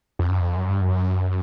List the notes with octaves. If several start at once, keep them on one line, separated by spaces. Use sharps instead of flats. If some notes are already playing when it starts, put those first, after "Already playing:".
F2
F#2
F2
F#2
G2
F#2